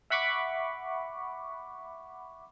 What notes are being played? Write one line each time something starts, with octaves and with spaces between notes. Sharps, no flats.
E5 F#5 B5 C#6 D6